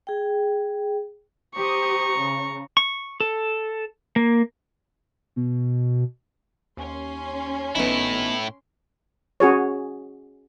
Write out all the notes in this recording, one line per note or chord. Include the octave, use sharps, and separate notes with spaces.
G#4 G5
G4 C5 A#5 C#6 D#6
C#3
C#6
A4
A#3
B2
D#2 C#4 C6
G#1 A2 B3 D#4 E4
C#4 F#4 G#4 C#5